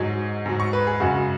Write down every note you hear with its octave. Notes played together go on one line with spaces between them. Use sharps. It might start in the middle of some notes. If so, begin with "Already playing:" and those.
Already playing: G#2 F#3
G#2 F#3
C#6
B4
G#4
F#2 C#3 G#3 F#4